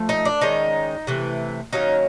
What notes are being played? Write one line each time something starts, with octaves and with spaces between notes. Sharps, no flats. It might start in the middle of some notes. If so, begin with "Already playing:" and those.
Already playing: F3 A3
D#4
D4
D#3 G#3 C#4 D#4
C3 E3 A3
D#3 F#3 A#3 C#4 D#4